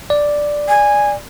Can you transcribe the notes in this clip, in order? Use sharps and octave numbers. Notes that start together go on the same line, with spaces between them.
D5
G#5